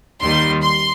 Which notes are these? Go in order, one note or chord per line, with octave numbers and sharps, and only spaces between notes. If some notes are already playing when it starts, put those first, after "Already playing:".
D#2 D#3 G3 C6
C6